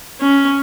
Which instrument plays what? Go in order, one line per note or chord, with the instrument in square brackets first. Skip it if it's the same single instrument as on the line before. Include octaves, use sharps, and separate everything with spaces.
[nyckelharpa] C#4